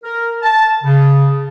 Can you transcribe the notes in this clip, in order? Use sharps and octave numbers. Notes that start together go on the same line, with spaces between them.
A#4
A5
C#3